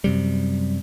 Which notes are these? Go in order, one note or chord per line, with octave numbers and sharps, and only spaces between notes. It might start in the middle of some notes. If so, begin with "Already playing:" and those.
F#2 C3 G3